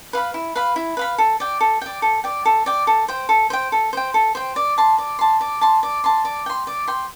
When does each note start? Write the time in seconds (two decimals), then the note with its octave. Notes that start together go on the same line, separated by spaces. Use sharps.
0.13 B4 F5 B5
0.34 E4
0.55 B4 F5 B5
0.76 E4
0.97 B4 F5 B5
1.18 A4
1.40 D5 G5
1.61 A4
1.81 D5 G5
2.02 A4
2.24 D5 G5
2.45 A4
2.66 D5 G5
2.87 A4
3.08 C5 G5
3.29 A4
3.50 C5 G5
3.72 A4
3.93 C5 G5
4.14 A4
4.35 C5 G5
4.56 D5
4.78 A5 C6
4.98 D5
5.19 A5 C6
5.41 D5
5.61 A5 C6
5.83 D5
6.04 A5 C6
6.25 D5
6.46 G5 C6
6.67 D5
6.88 G5 C6